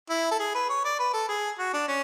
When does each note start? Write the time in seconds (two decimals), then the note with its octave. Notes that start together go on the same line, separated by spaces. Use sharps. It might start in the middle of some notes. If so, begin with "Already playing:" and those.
0.09 E4
0.31 A4
0.39 G#4
0.54 B4
0.69 C#5
0.84 D5
0.99 B4
1.13 A4
1.28 G#4
1.58 F#4
1.73 D4
1.88 C#4